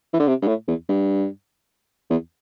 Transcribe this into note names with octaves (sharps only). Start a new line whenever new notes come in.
E3
D3
C3
G2
A2
E2
G2
E2